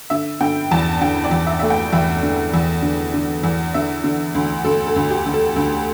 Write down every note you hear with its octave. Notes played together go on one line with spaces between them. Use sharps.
D3 E5
D3 G5
E2 A5
D3 G5
D5
E2
E5
A3 E5
G5
E2 E5
D3
E2
D3
D3
E2
D3 E5
D3
D2
D2 A4
A4
D2
G4
D2
A4
D2